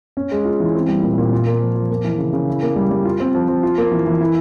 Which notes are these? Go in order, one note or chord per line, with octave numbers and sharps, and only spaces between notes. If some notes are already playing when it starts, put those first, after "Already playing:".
C#4
G#3
F4
E3
C4
G3
A#2
A#2
F4
A#3
F3
F3
A#3
E3
C#3
C#3
E4
A#3
G3
G3
F4
C4
F3
F3
F4
A#3
E3
E3
E4